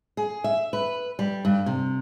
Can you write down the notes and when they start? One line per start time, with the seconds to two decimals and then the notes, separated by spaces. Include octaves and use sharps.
0.17 G#4
0.44 E5
0.73 B4
1.19 G3
1.45 G2
1.66 C3